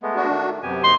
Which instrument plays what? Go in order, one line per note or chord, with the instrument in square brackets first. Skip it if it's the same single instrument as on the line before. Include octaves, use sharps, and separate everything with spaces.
[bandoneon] G#3 A3 B3
[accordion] D4 F#4
[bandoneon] D#3 A3
[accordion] F#2 C3 [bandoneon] B3 G4 G#5
[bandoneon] D#3 A#3 D#4 [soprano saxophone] C6